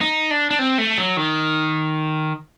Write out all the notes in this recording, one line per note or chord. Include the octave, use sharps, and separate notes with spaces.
D#4
D4
D4
C4
A3
F#3
D#3